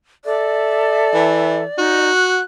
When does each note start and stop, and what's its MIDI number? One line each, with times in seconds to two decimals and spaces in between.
0.25 1.62 69
0.25 2.08 74
0.25 1.62 76
1.14 1.64 52
1.78 2.09 63
1.78 2.40 66
2.15 2.43 90